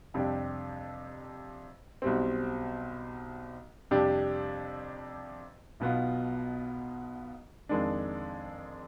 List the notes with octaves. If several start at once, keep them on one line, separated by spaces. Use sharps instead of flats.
F2 C3 G3 D4 G4
B1 B2 G3 C4
F2 C3 G3 D4 G4
B1 B2 B3 F4
F2 D#3 G#3 D4